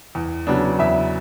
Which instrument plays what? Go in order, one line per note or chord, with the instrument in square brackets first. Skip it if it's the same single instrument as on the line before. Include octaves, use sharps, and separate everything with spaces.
[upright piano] E2
C#3 F#3 B3 D4 D5
E2 E4 E5